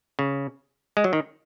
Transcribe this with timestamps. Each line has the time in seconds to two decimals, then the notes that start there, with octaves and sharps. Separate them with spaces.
0.19 C#3
0.97 G#3
1.04 F#3
1.13 D#3